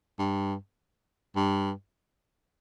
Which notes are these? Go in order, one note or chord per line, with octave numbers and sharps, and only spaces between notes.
G2
G2